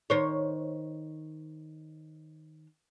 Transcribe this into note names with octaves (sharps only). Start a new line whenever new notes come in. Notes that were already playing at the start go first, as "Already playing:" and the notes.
D#3 C5 C#5